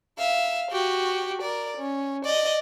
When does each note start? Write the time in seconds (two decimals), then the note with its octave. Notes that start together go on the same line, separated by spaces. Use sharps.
0.18 E5 F5
0.72 F#4 G4
1.42 A#4 D5
1.77 C#4
2.25 D5 D#5